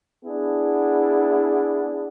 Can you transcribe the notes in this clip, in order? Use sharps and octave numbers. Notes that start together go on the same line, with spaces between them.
B3 D4 E4 G#4